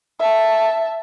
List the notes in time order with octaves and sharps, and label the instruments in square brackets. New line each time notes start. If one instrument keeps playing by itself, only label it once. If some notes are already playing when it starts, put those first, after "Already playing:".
[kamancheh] E5 A5